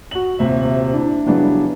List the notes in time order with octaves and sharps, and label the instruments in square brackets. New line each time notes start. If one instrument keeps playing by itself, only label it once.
[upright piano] F#4 F#7
D#1 C3 E5
D4 E4
C#3 E3 F#3 G3 B3 D4